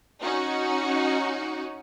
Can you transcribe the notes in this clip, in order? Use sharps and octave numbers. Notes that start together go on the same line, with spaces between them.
C#4 D#4 F#4